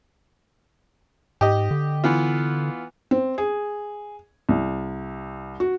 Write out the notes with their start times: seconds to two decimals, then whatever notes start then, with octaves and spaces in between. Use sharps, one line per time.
1.41 G#2 G4 D#5
1.71 D3
2.04 E3 B3 F4
3.11 C4
3.38 G#4
4.49 C2
5.60 F#4